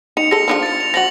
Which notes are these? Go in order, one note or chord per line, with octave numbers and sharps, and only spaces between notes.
D#4 C#7 F7
G#4 A4 A#6
F3 D4 F4
A6 C#7
F7
F3 F#4 A#6 F#7